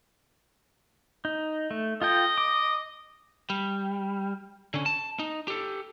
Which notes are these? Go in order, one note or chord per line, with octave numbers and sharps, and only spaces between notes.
D#4
A3
F4 A4 D#5 G5
D6
G3
D3 C#4
A5
D#4
G4 A4